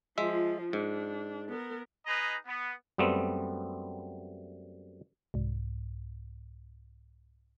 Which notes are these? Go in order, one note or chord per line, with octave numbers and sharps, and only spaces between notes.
F3 G#3 F4 E5
G#2 D4
B3 A#4
D#4 G#4 B4 D#5 A#5
B3
F#2 G3 A3 B3 C4
C2 G#2